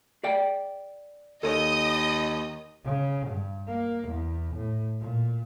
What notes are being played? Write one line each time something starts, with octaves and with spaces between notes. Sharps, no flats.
G#4 D5 G5
D#2 A4 C#5 D#5 D#6
C#3
G2
A#3
E2
A2
A#2